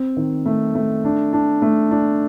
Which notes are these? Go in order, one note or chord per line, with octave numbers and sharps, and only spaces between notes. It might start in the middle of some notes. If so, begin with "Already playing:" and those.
Already playing: C4
D#3
A3
A3
D4
D4
A3
D4